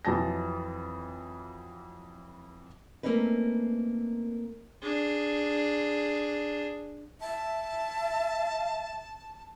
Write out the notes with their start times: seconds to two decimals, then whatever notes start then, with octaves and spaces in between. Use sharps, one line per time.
0.05 F2 E3 F#3 A5 A#6
3.03 A3 A#3 C4 C#4 D#4 B4
4.83 D4 G#4
7.21 E5 A5